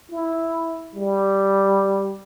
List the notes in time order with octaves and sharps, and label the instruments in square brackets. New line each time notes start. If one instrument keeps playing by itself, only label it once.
[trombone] E4
G3